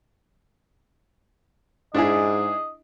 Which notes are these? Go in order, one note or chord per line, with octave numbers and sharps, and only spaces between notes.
G#2 D4 E4 G#4 D#5